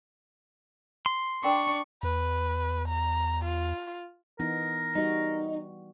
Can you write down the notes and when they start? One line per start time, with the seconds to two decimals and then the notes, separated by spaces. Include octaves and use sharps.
1.06 C6
1.43 D4 A#4 G5 C#6 D6
2.03 E2 B4
2.88 A#5
3.44 F4
4.39 E3 B3 D#4 A#4
4.95 G3 D#4 F#4